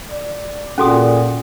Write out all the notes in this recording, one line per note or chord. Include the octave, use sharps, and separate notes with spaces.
D5
A#2 C#4 F#4 G#4 A4 F#5 D#6